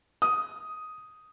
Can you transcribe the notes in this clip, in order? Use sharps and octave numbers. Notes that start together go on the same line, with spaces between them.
D#6